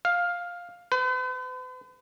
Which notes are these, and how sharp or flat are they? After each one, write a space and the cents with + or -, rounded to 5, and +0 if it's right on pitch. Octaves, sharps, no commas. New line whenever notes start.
F5 +10
B4 +45